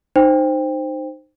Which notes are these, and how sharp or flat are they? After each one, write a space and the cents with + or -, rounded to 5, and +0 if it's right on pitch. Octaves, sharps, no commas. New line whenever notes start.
D#4 -20 C5 +0 G5 +20